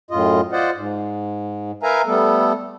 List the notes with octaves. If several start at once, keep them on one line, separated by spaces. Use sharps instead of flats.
F#2 A2 F4 D#5
F4 C5 D5 D#5 F#5
G#2
A#4 B4 E5 F5 G#5 A#5
G3 A3 B3 A4